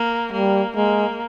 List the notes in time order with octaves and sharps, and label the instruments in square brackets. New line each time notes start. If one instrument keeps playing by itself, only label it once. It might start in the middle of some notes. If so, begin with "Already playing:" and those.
Already playing: [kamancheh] A#3
[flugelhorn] G3 [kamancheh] A#3
[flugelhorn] G#3 [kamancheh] A#3